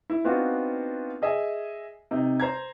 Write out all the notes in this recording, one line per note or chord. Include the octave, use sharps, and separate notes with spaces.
E4
B3 C4 D4 D#4 F4 F#4
G#4 D#5 E5 G#5
C3 D#4
C5 A#5 G#6